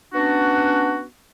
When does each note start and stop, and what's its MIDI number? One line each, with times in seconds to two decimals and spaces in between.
0.13 1.04 59
0.13 1.04 61
0.13 1.04 62
0.13 1.04 66